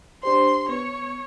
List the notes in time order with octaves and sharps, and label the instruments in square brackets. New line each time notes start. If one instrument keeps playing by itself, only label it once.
[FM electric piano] D4 G4 C5 [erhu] C6
[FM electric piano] B3 [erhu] C#5